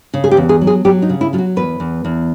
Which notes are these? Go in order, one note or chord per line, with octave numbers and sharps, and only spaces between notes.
C#3
G#4
G4
E2
G#4
F#3
G#4
F#3 G4
D#4
C#3
E4
F#3 F4
F#4
E2 B4
E2
E2